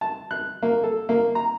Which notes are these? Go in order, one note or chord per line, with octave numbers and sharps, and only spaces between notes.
A5
F#6
A#3
A4
A#3
A#5